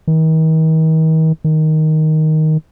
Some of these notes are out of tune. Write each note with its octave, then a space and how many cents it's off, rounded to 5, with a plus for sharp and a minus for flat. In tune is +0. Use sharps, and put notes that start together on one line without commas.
D#3 +40
D#3 +5